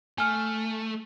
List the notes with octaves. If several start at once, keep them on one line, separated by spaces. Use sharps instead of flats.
A3 G#5 F6